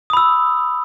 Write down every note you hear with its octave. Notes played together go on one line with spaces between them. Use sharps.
B5 D#6 E6